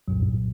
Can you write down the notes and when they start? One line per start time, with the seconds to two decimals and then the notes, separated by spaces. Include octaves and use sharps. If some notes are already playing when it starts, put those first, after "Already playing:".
0.08 C2 F#2 A#2 F#3
0.22 G2